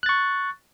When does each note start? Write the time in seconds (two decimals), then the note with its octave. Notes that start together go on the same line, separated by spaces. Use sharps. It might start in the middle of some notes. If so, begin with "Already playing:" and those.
0.03 F#6
0.06 A6
0.09 C#6